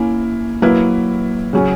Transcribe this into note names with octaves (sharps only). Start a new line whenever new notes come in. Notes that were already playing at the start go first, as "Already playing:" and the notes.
Already playing: A#3 C#4 E4
F#3 A#3 E4 B4
C#3 F#3 C#4